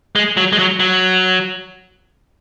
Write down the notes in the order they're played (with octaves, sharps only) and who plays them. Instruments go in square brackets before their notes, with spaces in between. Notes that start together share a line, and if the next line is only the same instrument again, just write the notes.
[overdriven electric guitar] G#3
F#3
G#3
F#3
F#3